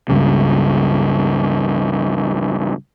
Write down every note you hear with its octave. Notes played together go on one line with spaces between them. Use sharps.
C#2 G2 C#3